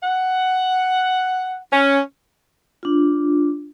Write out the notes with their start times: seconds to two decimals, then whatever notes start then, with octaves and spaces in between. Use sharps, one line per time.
0.02 F#5
1.72 C#4
2.83 D4 F4